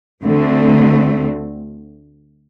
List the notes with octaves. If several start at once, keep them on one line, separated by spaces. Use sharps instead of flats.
D2 D3 A3 C4